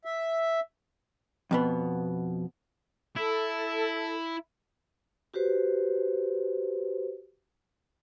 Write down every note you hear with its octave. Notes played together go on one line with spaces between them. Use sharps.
E5
F2 B2 B3
E4 A4
F#4 G4 B4 C5